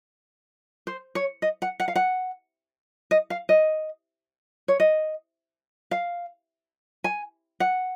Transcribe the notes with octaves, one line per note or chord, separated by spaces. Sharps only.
C5
C#5
D#5
F#5
F#5
F5
F#5
D#5
F5
D#5
C#5
D#5
F5
G#5
F#5